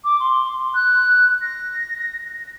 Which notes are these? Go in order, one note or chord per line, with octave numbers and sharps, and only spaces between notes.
D6
C6
F#6
A#6